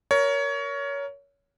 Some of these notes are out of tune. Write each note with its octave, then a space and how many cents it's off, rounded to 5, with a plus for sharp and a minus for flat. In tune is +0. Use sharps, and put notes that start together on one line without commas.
A#4 +5 C#5 +20